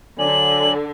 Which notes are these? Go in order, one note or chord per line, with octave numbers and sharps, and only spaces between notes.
D3 F#3 D5 G#5 F#7